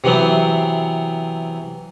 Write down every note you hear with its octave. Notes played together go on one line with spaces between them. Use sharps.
C3 E3 F#3 B3 C4